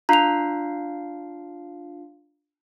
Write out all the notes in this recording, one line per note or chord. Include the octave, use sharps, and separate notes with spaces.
D4 F4 F5 A#5 F7